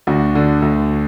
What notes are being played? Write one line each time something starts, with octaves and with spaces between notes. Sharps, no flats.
D2 D4 F#4
D3
D2